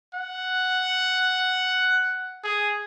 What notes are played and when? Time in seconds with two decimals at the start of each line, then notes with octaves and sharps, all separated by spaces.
0.14 F#5
2.44 G#4